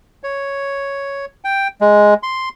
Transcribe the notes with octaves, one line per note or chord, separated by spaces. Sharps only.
C#5
G5
G#3
C6